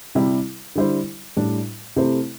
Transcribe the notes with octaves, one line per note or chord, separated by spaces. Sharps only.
C3 G3 E4 G4
D3 G3 E4 C5
A2 G3 D4
C3 A3 E4 C5